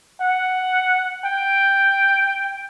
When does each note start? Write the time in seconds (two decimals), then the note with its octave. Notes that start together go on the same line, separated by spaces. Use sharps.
0.21 F#5
1.26 G5